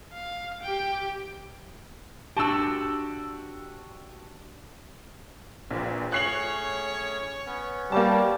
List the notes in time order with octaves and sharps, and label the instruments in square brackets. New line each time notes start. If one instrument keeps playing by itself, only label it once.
[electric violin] F5
G4 G5
[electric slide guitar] D4 F#4 G4 [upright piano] A5 E6
[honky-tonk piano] A#1 [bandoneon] A#2 E3 C4
[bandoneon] A2 C#4 G#4 [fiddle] C#5 [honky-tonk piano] F#6 C7 F#7
[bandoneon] B3 C#4
[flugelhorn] G3 [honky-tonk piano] A#3 A5